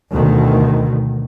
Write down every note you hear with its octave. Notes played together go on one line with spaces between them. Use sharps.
D2 B2 D#3